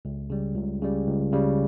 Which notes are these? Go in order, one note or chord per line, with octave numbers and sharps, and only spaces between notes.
C#2
C#3 G3
C#2
C#3 G3
C#2
C#3 G3